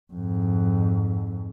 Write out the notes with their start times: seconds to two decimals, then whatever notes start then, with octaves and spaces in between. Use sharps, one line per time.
0.13 F2 G#2